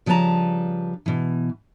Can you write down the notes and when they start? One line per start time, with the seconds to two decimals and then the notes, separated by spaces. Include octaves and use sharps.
0.06 C#3 F3 G3 B4 A5 A#5
1.06 B2 E3